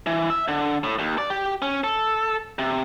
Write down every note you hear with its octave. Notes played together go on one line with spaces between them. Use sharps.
E3
E5
D3
A2
D#2
D5
G4
C#4
A4
C3